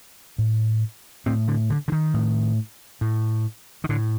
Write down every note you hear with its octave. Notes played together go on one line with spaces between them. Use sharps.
A2
A2 C4
D3
D3
D3
D#3
A2
A2
D#3
A2 D3